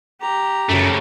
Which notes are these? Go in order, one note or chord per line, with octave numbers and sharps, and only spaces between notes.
G4 A#5
F#2 C#3 A3